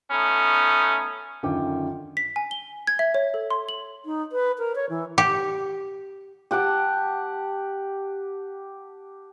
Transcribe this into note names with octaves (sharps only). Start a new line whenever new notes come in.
A3 B3 C#4 D#4
F#2 D3 D#3 F4 G5 D6
B6
G#5
G7
G#6
E5
C#5
A4
C6
F#7
D#4
B4
A#4
C#5
E3
G4
G4 F#5 G5 A5